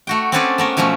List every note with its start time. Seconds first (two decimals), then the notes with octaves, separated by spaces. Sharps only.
0.07 A3 F#4 G5
0.32 C4 C#4 G#4 A4 B4 D5
0.58 A3 B3 A#4
0.77 B2 F3 F#3 A3 C#4